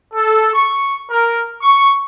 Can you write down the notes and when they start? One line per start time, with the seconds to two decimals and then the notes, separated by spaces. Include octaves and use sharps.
0.14 A4
0.54 C#6
1.11 A#4
1.62 C#6